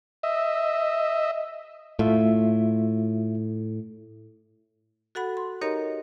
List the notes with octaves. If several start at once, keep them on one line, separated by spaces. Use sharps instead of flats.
D#5 E5
A2 A3 F4 E5
F#4 A4 F#5 B5
C6
D#4 G4 A#4 C#5 D#5 A#5